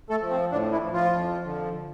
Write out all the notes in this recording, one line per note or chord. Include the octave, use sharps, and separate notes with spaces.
A3 A4
F3
C4
A2 D3 D4
E3 E4
F3
F3 F4
F2
D3 F3